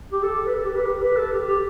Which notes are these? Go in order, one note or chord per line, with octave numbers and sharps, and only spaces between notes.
G4
A4
B4
A4
G4
B4
G4
B4
A4
G4
G4